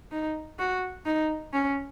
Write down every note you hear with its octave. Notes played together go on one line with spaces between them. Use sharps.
D#4
F#4
D#4
C#4